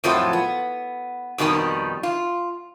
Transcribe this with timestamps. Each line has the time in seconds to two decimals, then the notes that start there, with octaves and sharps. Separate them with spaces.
0.04 F2 A2 F3 F#3 F4 A4
0.33 B3
1.38 F2 B2 D#3 G3 D#4
2.03 F4